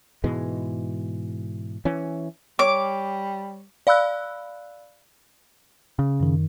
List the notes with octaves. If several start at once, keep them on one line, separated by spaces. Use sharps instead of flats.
G#2 B2 E3 G#3
E3 C#4
G3 C#5 D6
D5 F5 B5 E6 F#6
C#3
F#2 D#3